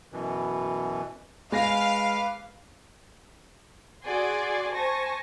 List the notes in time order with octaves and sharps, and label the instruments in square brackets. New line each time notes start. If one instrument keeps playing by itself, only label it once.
[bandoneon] F#2 B2 E3
[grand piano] G#3 G#5 A#6 [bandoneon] B4 D6 [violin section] F5
[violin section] F#4 G#4 D5 G#5 C6
C5 G#5 A5 C#6 A#6